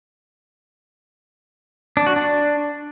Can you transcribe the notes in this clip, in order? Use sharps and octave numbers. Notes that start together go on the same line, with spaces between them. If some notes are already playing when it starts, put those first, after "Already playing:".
D4
F#4
D4